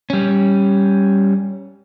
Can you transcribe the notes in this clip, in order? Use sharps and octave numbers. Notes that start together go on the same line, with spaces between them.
G3 C#4